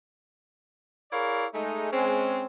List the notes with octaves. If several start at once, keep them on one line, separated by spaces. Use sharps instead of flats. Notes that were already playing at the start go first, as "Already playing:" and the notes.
E4 G#4 A#4 C#5 D5 F5
G#3 A3 D#4
G#3 C4 C#4